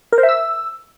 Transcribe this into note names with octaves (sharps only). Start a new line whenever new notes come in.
A#4
C5
E5
E6